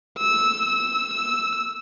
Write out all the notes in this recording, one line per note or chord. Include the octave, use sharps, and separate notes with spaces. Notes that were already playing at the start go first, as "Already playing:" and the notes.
E6
E6
E6